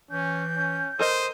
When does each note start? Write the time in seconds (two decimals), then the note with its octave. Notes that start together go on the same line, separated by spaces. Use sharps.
0.11 E3 C#4 G6
0.56 C#4
0.99 A4 A#4 C5 D#5 D#6